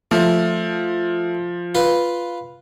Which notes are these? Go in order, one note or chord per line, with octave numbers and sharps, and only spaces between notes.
F3 A3
F4 B4